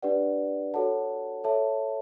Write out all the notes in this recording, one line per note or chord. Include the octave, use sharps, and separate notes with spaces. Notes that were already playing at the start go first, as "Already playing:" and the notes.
D4 G4 B4 D5 F#5
F#4 A4 C#5 F#5 A5
A4 C#5 E5 A5